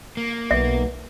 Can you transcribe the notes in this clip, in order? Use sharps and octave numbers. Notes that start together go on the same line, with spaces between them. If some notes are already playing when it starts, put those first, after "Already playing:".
A#3
B1 B3 E5